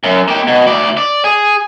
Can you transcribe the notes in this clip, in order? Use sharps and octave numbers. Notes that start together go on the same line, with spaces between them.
F#2
A#3 G5
B2
D2 D5
D5
G#4